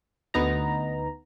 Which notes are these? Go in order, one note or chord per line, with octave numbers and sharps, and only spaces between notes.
D2 B3 D#4 A#5